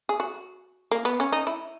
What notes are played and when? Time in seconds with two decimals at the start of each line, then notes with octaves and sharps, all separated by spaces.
0.09 G#4
0.20 F#4
0.91 A#3
1.05 B3
1.20 C#4
1.32 D#4
1.47 E4